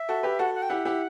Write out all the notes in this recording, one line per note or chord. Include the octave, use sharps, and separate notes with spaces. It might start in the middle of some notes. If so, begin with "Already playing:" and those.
Already playing: E5
F#4 A4
G4 B4
F#4 A4 F#5
F#5
G5
E4 G4 F#5
E4 G4